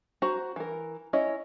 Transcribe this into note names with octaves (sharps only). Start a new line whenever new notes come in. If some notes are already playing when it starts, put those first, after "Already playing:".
F#4 C5 A#5
E3 A#4
C#4 E4 C#5 D#5